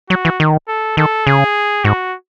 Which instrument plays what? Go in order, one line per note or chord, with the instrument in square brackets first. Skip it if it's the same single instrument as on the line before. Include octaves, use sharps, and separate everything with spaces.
[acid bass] F#3 [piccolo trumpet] F#4
[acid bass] E3
D#3
[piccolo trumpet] A4
[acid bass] D#3 [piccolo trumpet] A4
[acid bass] C#3 [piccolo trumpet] G#4
[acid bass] G#2 [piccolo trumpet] F#4